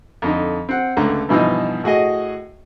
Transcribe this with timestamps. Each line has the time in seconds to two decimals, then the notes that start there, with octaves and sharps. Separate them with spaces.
0.22 F2 D3 D#4
0.69 C4 F#5
0.97 C#2 D3 A3 A#5
1.29 G2 B2 E3 F3 D#4
1.84 A2 F#4 G#4 D#5